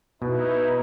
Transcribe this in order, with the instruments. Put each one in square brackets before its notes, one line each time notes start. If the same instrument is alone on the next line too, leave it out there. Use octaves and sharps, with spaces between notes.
[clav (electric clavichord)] B2 [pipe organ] D#4 E4 [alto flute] B4